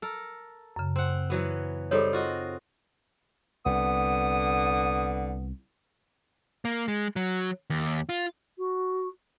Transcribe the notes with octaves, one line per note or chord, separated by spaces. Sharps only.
A4 A#4
F#2 C#3
C4 F#5
E3 F#3 B3
G3 C4 D#4 G#4 A4 C#5
F4 F#4 D#5
C2 D3 B3 D#6
A#3
G#3
F#3
D#2
F4
F#4